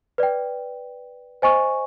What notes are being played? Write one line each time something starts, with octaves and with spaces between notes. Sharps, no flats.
B4 D5 G5
C5 D#5 G#5 C#6